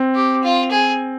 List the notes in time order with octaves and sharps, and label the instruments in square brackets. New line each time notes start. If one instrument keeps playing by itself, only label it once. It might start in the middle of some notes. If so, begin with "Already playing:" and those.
Already playing: [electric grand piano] C4
[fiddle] G4
F4
G#4